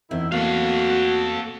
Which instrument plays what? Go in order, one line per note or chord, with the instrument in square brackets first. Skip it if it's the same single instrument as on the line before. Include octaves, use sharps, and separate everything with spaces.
[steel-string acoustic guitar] E2 C4 [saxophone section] D3 D#3 E4
[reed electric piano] A3 A#3 [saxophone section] F#4 [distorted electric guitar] A4 F5